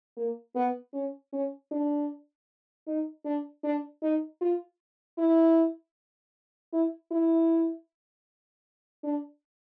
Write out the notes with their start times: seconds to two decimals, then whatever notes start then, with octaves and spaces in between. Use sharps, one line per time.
0.17 A#3
0.55 B3
0.93 C#4
1.33 C#4
1.71 D4
2.87 D#4
3.25 D4
3.64 D4
4.03 D#4
4.41 F4
5.18 E4
6.73 E4
7.11 E4
9.04 D4